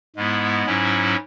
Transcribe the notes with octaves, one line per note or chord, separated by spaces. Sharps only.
G#2 G#3 B3 E4
G#2 F#3 C#4 E4